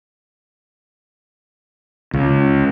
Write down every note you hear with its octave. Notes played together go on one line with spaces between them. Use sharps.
C#2